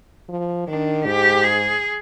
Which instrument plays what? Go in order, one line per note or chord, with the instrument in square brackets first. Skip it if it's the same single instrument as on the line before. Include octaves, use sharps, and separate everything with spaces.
[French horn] F3
[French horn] D#3 [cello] D4
[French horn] G#2 [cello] G4
[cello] G#4